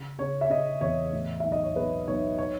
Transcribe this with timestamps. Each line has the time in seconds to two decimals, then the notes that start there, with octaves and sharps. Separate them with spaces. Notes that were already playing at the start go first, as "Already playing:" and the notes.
Already playing: C#3
0.19 C#3 C#5
0.41 E5
0.50 C#3 D#5
0.81 E2 C#5
1.13 A2
1.40 B1 E5
1.52 D#5
1.63 C#5
1.75 B1 B4
2.07 B1 C#5
2.38 C#5